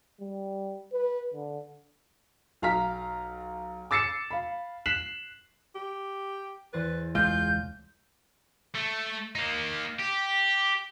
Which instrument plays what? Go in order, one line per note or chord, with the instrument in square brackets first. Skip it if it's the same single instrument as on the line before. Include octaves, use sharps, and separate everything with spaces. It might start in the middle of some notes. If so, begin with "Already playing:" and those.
[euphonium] G3
B4
D3
[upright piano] B1 F5 A#5 F6 B6
D6 E6 A6 C7 C#7 E7
F5 B5
F#6 B6 C7 E7 F#7
[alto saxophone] G4
[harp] E2 C5 A6 [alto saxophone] B4
[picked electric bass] E1 C#2 G#3 [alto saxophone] F4 [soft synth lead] G6
[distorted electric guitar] A3
A#3 D#4
G4